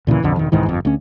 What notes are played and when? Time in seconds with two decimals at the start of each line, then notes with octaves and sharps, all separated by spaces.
0.07 D2 A#2 C#3 E3
0.23 B1 F2 D3
0.37 E1 D#3
0.52 C2 G#2 D#3 E3
0.66 G1 F2
0.85 D2 C#4